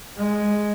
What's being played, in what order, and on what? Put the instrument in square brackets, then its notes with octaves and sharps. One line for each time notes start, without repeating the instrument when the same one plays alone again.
[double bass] G#3